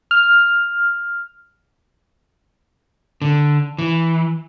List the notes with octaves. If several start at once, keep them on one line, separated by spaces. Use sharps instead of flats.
F6
D3
E3